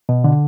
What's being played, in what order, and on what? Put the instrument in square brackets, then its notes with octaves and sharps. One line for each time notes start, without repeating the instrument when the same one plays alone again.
[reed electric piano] B2
D3